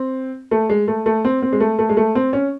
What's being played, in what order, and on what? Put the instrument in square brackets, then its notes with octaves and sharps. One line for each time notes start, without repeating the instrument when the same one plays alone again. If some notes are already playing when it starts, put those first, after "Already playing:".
Already playing: [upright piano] C4
A3
G#3
A3
A3
C4
C4
G#3
A3
A3
G#3
A3
C4
C#4